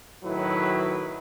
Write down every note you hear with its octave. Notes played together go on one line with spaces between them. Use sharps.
A2 D#3 F#3 E4 B4